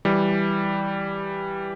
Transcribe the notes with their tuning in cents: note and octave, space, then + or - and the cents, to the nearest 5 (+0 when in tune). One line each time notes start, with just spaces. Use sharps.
E3 +0 G3 +0